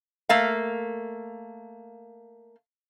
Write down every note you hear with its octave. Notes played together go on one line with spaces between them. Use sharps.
A3 A#3 F5